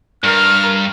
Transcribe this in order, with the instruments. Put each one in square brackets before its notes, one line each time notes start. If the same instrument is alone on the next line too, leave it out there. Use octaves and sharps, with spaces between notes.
[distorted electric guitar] G2 [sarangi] A#4 [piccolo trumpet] F6